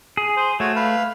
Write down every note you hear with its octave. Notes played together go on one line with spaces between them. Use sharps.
G#4
C5
A3 F#4 C#5
B4 F5